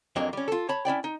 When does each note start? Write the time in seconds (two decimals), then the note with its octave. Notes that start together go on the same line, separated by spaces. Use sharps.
0.16 F2 F#3 G#3 A#3 D4
0.33 G3 C#4
0.48 F4 A4
0.69 C#5 A5 B5
0.85 C#4 E4 D5 G5
1.04 D#4